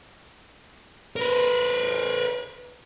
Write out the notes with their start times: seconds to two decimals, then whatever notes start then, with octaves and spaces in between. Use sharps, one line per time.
1.16 A#4 B4